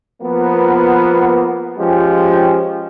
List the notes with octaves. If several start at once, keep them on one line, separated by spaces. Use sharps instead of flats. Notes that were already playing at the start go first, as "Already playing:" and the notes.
F3 A#3 B3
F3 G#3 C#4 G4